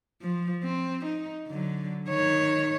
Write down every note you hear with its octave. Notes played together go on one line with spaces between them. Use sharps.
F3
C4
D#4
D3 F#3
D#3 C#5